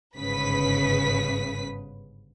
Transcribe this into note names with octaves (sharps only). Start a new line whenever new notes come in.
G1 G#2 C#3 B4 B6